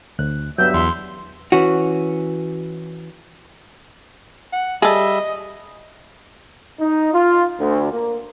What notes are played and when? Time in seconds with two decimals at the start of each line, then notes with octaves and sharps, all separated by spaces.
0.19 D2 F#6
0.58 G2 F#3 B3 E5 G6
0.74 E2 C6
1.52 E3 C#4 F#4
4.53 F#5
4.82 G3 G#4 A4 D#5 E5
6.80 D#4
7.14 F4
7.60 D2
7.92 A#3